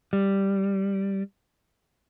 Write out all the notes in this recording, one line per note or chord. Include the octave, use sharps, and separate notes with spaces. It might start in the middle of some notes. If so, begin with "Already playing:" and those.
G3